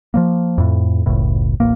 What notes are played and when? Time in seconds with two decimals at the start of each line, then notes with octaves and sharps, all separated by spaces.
0.14 F3 F#3 A#3
0.58 F2 A2
1.06 F#1 C#2 A2
1.60 D1 A1 A#3